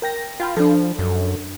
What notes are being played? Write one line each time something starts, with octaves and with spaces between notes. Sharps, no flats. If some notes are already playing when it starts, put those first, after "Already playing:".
A#4 G5 A#6
F4 F5 G5 B5
F3 D4 A4
F#2